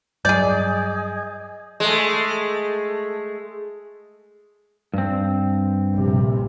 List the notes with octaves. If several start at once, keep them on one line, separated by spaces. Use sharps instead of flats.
G2 F#3 G#4 D5 D#5 G#5 G6
G#3 A3
G2 C4
A#1 C3